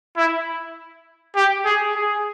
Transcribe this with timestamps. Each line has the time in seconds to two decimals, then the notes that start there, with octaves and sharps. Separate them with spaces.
0.17 E4
1.36 G4
1.65 G#4
1.95 G#4